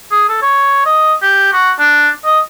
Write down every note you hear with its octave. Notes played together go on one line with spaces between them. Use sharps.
G#4
A4
C#5
D#5
G4
F#4
D4
D#5